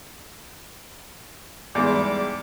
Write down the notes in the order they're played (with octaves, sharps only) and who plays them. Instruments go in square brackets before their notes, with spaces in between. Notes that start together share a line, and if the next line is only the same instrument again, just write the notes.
[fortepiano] E2 G#2 [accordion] G3 D6